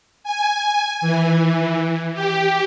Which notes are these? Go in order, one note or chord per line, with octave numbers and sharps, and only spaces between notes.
G#5
E3
G4